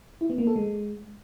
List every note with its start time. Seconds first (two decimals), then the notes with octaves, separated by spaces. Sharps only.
0.21 E4
0.30 B3
0.38 A#3
0.47 A4
0.56 G#3